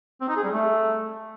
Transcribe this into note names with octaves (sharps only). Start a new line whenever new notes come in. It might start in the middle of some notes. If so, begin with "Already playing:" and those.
C4
D#4
G#4
G3
A3